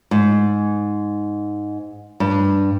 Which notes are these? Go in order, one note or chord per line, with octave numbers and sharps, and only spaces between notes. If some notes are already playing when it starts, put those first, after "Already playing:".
G#2
G2